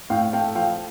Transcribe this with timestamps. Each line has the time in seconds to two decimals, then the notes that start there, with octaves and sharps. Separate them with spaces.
0.10 A2 F5 G5
0.33 A3 F5 G5
0.55 F3 F5 G5